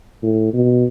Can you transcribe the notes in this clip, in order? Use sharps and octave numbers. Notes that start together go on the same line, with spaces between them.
A2
B2